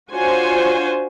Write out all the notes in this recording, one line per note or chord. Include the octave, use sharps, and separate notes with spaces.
D4 F4 F#4 C5 C#5 G#5